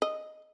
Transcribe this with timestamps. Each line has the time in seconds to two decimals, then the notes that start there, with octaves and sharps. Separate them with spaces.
0.02 D#5